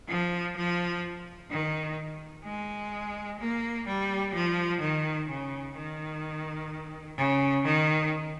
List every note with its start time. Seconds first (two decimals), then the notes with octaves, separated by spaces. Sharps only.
0.08 F3
0.56 F3
1.50 D#3
2.44 G#3
3.39 A#3
3.87 G3
4.34 F3
4.81 D#3
5.29 C#3
5.76 D#3
7.17 C#3
7.65 D#3